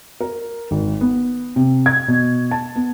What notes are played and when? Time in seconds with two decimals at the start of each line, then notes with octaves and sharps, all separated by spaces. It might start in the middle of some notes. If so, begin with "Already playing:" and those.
0.21 A#4
0.71 G#1
1.01 B3
1.56 C3
1.86 G#6
2.08 B2
2.51 A5
2.76 B3